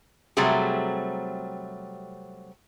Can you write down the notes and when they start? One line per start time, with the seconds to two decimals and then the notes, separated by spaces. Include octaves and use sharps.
0.37 C3 F#3 G3 A3 C4 G#4